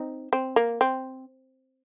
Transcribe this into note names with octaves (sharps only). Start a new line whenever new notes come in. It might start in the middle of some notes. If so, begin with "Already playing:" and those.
Already playing: C4 D#4
C4
A#3
C4